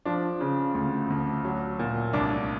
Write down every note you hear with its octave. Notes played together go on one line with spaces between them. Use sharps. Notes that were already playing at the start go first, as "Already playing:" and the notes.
F3 D4
C#3
D2
D2
F#3
A#2
C2 D4